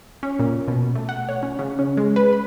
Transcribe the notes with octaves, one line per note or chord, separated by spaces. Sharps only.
C#4
A#2
B2
A3
F#5
C#5
C#4
C#3
C#4
G#3
B4
B5